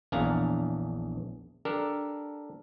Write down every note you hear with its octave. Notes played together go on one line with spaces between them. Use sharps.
A#1 E2 C#4 D4 F5 A#5
D4 G4 A4 A#4